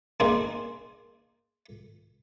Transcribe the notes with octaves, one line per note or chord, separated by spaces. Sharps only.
A#3 C4 D4 D#4 G#4 C5